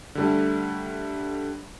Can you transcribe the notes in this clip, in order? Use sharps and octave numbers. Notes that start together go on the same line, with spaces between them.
D3 G3 A3